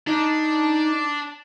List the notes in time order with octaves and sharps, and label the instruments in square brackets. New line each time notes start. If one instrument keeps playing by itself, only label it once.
[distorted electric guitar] D4 [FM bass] D#4